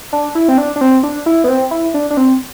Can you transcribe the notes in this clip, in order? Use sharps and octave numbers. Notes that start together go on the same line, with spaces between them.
D4
E4
C4
D4
D4
C4
D4
E4
B3
C4
E4
D4
D4
C4